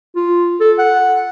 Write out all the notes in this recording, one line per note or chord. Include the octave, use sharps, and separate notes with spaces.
F4
A4
F#5